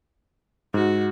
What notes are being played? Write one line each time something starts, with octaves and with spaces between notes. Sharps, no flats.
G#2 F#4